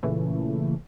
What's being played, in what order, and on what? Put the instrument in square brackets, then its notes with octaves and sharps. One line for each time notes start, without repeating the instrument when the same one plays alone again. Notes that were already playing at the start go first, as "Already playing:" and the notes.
[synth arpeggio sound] A#2 C#3 E3 A3